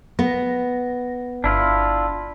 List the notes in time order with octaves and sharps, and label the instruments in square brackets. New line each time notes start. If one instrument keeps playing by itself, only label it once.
[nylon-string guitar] B3 [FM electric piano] A#6
[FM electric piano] G1 [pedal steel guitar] D4 E4 F4